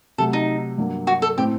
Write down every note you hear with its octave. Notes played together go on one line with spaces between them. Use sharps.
C3 F#3 A3 A4
D#4
G2 F#3 A#3
F#4
A4
A2 A3 C4 G4